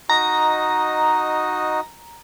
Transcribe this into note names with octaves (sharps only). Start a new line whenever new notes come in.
D#4 F#4 D#5 A#5